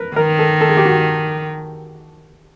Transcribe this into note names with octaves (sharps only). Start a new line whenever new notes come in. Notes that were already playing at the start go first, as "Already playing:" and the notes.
Already playing: A#4 B4
D#3 A#4
A4
A4
G#4
G4
F#4